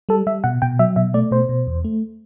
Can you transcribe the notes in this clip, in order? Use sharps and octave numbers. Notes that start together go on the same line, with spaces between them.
G3 A4
G3 E5
B2 F#5
B2 G5
F#3 E5
B2 E5
A3 D5
B2 C5
B2
E2
A3